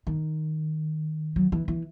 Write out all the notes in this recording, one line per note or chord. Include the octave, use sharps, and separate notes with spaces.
D#3
F#3
E3
E3